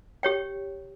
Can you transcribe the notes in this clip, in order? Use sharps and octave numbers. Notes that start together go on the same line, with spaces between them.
G4 C#5 G5